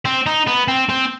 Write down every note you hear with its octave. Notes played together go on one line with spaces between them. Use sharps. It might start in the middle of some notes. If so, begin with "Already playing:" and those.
C4
D#4
B3
C4
C4